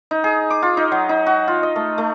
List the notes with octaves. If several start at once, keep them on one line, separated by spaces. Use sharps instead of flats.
D#4
G#4
D6
F4
D#4
F#3
D#4
F#4
F4
D#5
A3
A3